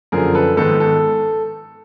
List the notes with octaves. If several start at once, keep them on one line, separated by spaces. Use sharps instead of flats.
F#2 D3 F3 G#4 A#4
A4 B4
G#2 D#3 G#3 B3 A4 B4
A4